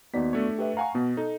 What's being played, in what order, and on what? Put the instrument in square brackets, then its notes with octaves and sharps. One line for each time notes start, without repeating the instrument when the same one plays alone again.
[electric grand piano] D#2 D#4 B6 [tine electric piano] B3 F#4 D5
[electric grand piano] A3 D4 C#5
[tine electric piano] G4 B4 E5
[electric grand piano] F5 F#5 G#5 [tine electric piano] A#5 C#6
[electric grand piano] B2 [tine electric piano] B3
[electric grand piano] D#4 [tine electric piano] A4